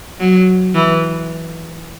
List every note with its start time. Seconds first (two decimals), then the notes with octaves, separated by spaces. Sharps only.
0.20 F#3
0.74 E3